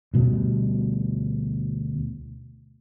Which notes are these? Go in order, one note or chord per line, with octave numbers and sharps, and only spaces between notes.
D2 B2 G3